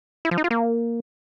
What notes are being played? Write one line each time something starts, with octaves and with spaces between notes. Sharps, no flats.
E4
F3
D#4
F4
A#3